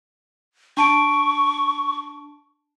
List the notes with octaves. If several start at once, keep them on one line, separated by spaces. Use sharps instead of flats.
D4 A5 C#6 D7